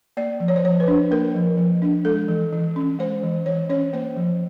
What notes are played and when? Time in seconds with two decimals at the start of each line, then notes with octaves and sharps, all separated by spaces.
0.17 A#3 D5
0.40 F3
0.48 C#5
0.56 C5
0.64 F3 C#5
0.80 B4
0.88 D4
1.11 A#3 A#4
1.34 F3
1.58 F3
1.82 D4
2.05 G#3 A4
2.28 E3
2.53 E3
2.76 C#4
2.99 G#3 C5
3.23 E3
3.46 E3 C#5
3.69 C#4 C#5
3.93 A#3 C5
4.17 F3